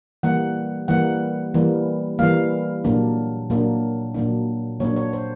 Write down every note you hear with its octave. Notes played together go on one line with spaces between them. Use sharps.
E3 G3 A#3 F#5
E3 G3 A#3 F#5
E3 G3 A#3
E3 G3 A#3 F5
A#2 F#3 A#3 D4
A#2 F#3 A#3 D4
A#2 F#3 A#3 D4
A#2 F#3 A#3 D4 C#5
C#5
C5